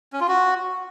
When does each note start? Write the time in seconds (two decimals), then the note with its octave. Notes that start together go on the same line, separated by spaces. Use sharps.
0.13 C#4
0.20 F4
0.28 F#4